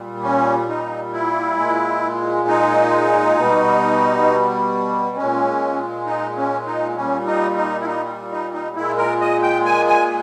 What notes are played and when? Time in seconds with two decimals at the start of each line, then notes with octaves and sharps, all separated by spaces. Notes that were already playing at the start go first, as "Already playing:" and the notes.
Already playing: A#2 G3
0.23 C#4
0.69 D#4
1.13 E4
1.58 A#2 G#3
2.48 D#4
3.37 B2 G3
5.17 A#2 G#3 C#4
6.06 D#4
6.37 C#4
6.66 D#4
6.96 A#2 G3 C#4
7.26 D#4
7.56 D#4
7.81 E4
7.86 D#4
8.31 D#4
8.54 D#4
8.76 A#2 G#3 E4
8.98 A#4
9.21 D#5
9.43 G5
9.66 G#5
9.88 G#5